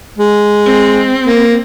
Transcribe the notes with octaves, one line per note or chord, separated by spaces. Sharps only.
G#3
C4
A#3